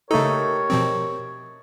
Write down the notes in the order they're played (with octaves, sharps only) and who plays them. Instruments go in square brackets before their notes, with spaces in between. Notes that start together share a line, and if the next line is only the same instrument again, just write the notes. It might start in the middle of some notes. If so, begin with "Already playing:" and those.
[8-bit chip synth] C#3 A4 [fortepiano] A3 D#4 [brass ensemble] G4 A#4 [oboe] C#5
[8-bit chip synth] B2 F3 C4